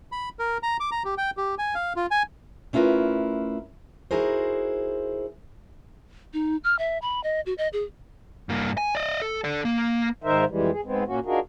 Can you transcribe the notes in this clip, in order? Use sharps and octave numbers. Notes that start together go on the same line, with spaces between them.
B5
A#4
A#5
D6
A#5
G4
G5
G4
G#5
F5
F4
G#5
A3 C#4 E4 F4 A#4 B4
D#4 E4 F#4 G#4 A#4 C5
D#4
F6
E5
B5
D#5
F#4
D#5
G#4
G2 A#3
G#5
D5 D#5
A4
A4 D5
A#3
G#2 D#3 D#4 A#4 C5 E5
F2 E3 G3 G#3
G#4
G#2 G#3 B3 C4
A#2 A#3 C#4 F#4
D4 D#4 F4 F#4 G#4 A#4